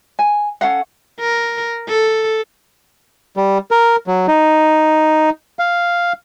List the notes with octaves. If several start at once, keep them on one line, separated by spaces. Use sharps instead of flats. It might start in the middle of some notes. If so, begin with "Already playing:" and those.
G#5
C#4 A4 F5 F#5
A#4
A4
G3
A#4
F#3
D#4
F5